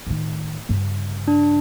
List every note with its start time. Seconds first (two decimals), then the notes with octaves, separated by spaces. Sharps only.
0.07 A2 D#3
0.69 G2 C#3
1.28 D4